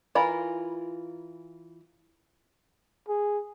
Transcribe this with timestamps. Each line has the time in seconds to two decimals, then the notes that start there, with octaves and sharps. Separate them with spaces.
0.15 E3 F4 A#4 B5
3.08 G#4